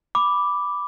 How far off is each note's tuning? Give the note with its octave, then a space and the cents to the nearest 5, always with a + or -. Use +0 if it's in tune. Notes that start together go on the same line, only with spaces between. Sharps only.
B5 +0 D6 +0